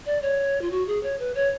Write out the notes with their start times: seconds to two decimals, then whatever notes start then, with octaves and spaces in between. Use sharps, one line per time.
0.06 D5
0.22 C#5
0.62 F4
0.71 F#4
0.87 G#4
1.03 C#5
1.19 B4
1.35 C#5